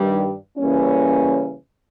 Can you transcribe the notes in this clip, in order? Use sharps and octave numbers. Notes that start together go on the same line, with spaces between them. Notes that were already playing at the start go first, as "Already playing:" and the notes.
Already playing: G2 D#3 G3
C#3 E3 G3 A#3 C#4